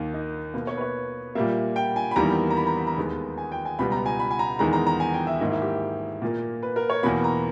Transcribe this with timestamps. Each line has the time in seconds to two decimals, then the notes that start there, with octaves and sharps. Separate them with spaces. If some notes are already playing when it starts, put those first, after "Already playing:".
Already playing: D#2 D#3 A#3
0.14 D#4
0.54 B2 A#3 B4
0.67 C#5
0.77 B4
0.81 C#5
1.35 A#2 G3 A#3 E5
1.76 G5
1.96 G#5
2.11 B5
2.16 E2 D#3 G3 A#3 A#5
2.50 A#5
2.57 B5
2.67 A#5
2.77 B5
2.87 A#5
2.98 D#2 D#3 G#3 B3
3.38 G#5
3.52 G5
3.65 G#5
3.79 C#2 B2 G3 B3 B5
3.92 A#5
4.06 G#5
4.19 B5
4.31 G#5
4.39 A#5
4.59 E2 D#3 G#3 A#5
4.73 A#5
4.87 A#5
5.00 G#5
5.14 G5
5.27 E5
5.41 G#2 D#3 A#3 D#5
5.52 E4
5.62 G4
6.22 A#2 A#3
6.63 B4
6.76 A#4
6.90 C#5
7.03 E2 B2 A#3 B5
7.24 A#5